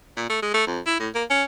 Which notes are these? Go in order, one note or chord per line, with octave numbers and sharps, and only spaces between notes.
A#2
A3
G#3
A3
F2
E4
A2
A#3
C#4